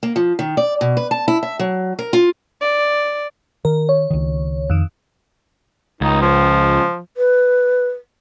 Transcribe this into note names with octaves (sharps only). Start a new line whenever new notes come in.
A#3
F3
D#3
D5
B2
B4
A5
E4
E5
F#3
A#4
F4
D5
D#3 A#4
C#5
C#2 D#3
F2 D#3
C#2 D#4
F3
B4